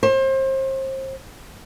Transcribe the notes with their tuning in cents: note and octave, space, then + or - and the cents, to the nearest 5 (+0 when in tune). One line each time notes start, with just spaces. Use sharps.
C5 +30